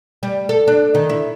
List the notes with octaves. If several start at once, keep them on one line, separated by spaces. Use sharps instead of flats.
G3
A4
D4
D#3
E4